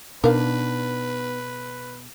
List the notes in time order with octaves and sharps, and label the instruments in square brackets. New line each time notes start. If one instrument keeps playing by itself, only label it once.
[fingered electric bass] B2 [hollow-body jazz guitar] B3 D4 D#4 [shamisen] A#4 F5 [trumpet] B4